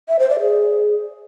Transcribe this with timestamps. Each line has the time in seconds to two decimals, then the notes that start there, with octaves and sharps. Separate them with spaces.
0.08 E5
0.19 C5
0.30 D5
0.40 G#4